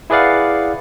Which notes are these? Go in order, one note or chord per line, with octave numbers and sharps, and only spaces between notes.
E4 G#4 B4 D5 F5 F#5